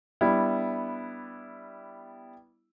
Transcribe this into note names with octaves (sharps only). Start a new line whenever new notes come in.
G3 B3 D4 E4